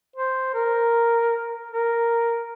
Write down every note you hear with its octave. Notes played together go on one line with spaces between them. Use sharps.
C5
A#4
A#4